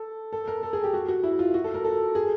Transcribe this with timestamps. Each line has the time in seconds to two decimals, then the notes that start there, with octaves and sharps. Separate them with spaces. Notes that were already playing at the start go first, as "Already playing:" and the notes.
Already playing: A4
0.33 A4
0.48 A#4
0.63 A4
0.73 G#4
0.84 G4
0.94 F#4
1.08 F#4
1.23 E4
1.39 F4
1.54 F#4
1.64 A4
1.74 A#4
1.85 A4
2.15 G#4